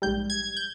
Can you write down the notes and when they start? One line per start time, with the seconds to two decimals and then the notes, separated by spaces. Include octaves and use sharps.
0.02 A#1 G#2 G3 G6
0.30 G#6
0.57 G6